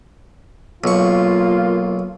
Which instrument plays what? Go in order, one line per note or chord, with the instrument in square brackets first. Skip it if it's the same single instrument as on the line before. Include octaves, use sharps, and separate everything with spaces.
[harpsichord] B1 C#6 [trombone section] A#3 F4